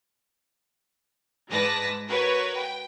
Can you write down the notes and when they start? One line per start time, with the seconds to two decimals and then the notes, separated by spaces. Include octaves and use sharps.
1.50 G#2 G#3 B4 D5 A5 A#6
2.08 F#4 A#4 B4 C#5
2.55 G5